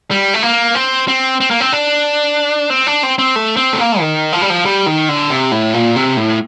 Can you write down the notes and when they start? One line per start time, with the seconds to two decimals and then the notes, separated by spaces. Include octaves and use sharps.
0.11 G3
0.34 A3
0.43 A#3
0.75 C4
1.08 C4
1.40 C4
1.51 A#3
1.60 C4
1.73 D4
2.70 C4
2.87 D4
3.03 C4
3.18 C4
3.36 A3
3.57 C4
3.73 A3
3.79 A#3
4.00 D#3
4.33 F3
4.42 G3
4.50 F3
4.65 G3
4.86 D#3
5.09 D3
5.30 C3
5.52 A2
5.74 A#2
5.96 C3
6.17 A2